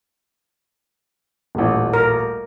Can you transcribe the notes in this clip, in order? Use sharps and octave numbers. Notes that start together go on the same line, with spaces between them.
D#1 A1
A#4